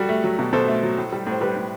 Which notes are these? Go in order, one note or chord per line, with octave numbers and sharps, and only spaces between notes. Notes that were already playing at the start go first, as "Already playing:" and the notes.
Already playing: G3 F#4 A4
A3
F#3
B2
B2 A4 C5
A3
F#3
A2
G3
A2
C5
G3 G4 B4
A2